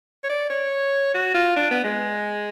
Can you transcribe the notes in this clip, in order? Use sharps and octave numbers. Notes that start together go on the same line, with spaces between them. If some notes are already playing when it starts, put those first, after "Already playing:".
C#5
D5
C#5
F#4
F4
D4
B3
G#3